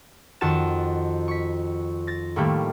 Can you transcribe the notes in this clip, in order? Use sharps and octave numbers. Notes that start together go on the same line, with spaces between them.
F2 D#3 F#4 A5 A6 E7
C#6 B6
A6 A#6
A2 D#3 F3 G3 A3 A#3